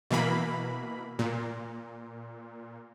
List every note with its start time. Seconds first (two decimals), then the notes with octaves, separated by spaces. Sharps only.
0.10 B2 E3 A#3 B5
1.19 A#2